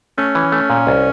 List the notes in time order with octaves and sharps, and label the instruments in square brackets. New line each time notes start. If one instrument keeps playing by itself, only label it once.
[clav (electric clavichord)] A3 [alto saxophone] C#4
[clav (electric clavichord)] E3
A3
A#2
C2